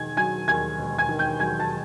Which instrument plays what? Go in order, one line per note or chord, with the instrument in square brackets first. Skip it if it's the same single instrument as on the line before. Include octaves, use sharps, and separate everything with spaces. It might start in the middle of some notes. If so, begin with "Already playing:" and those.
Already playing: [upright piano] E1 D#3 G#5 G#6
F#3 G#5 G#6
D#2 G#5 G#6
E1
G#5 G#6
D#3
G5 G6
F#3 G#5 G#6
A5 A6